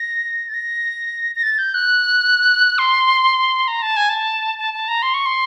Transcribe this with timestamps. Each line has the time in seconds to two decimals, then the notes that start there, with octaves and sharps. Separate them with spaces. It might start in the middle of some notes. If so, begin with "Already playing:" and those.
Already playing: A#6
0.49 A6
0.54 A#6
1.36 A#6
1.43 A6
1.58 G6
1.74 F#6
2.78 C6
3.68 A#5
3.82 A5
3.97 G#5
4.09 A5
4.59 A5
4.74 A5
4.88 A#5
5.02 C6
5.14 C#6
5.26 C6